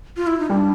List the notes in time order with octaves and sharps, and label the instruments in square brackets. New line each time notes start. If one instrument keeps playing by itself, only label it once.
[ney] F4
E4
D#4
[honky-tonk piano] G3 [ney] D4